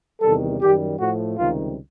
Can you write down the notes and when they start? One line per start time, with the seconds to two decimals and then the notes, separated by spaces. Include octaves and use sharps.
0.21 E2 C3 D#3 G3 A4
0.60 F#2 D#3 G3 G4
0.99 A2 F3 A3 F#4
1.38 C#2 C3 D#3 G3 F4